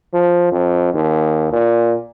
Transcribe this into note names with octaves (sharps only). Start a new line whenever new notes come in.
F3
F2
D#2
A#2